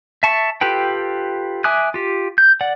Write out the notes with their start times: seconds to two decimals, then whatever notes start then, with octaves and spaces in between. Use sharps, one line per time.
0.23 E5 A5 C#6
0.61 F4 G4 A4 B4 G5
1.64 E5 G#5 D6 D#6 F#6
1.94 F4 G4
2.38 G6
2.61 D5 F#5